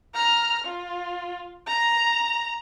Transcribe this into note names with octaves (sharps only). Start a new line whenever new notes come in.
A#5 F6
F4
A#5